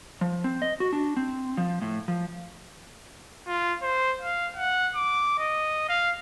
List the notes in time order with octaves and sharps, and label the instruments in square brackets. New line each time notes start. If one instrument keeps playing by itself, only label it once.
[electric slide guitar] F3
C4
D#5
F#4
D4
C4
F3
A2
F3
[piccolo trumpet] F4
C5
F5
F#5
D6
D#5
F5